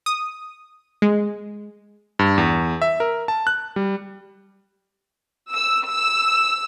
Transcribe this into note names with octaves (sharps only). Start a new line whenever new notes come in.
D#6
G#3
G2
E2
E5
A#4
A5
F#6
G3
E6
E6